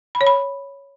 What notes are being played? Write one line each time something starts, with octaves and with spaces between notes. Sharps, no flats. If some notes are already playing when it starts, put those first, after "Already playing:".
B5
C#5
B5